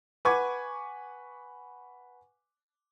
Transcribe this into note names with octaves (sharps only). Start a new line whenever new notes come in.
B4 F#5 G#5 C#6 D6 G#6